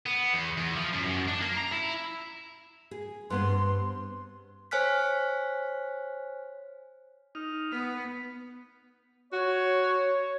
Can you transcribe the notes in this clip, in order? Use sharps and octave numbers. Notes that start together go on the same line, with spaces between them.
B3
E2
E2
F3
F#2
F#2
D4
A#3
A#5
E4
G#4
G2 B3 C4 C6
C5 C#5 G#5 F6 F#6 B6
D#4 F6
B3 B4
F#4 C#5